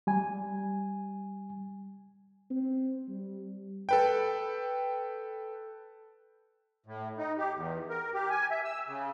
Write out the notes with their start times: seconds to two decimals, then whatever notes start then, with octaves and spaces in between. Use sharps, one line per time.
0.07 G3 G#5
2.51 C4
3.09 G3
3.89 A4 B4 G5
6.86 A2
7.18 D#4
7.38 G4
7.54 E2
7.90 A#4
8.14 G4
8.30 G#5
8.51 E5
8.65 E6
8.88 C#3